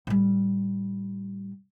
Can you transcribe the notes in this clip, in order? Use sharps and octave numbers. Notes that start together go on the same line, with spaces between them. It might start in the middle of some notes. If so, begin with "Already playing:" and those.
A2 G3